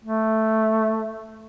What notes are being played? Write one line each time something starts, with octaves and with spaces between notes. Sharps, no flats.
A3